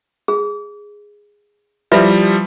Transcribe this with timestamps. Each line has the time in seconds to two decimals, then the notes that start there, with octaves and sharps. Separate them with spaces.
0.28 G#4
1.92 F3 G3 E4 F4 B4 E5